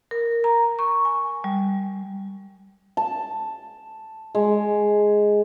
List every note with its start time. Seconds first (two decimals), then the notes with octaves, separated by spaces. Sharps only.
0.11 A#4
0.44 A#5
0.79 C#6
1.05 G#5
1.44 G3
2.97 A5
4.35 G#3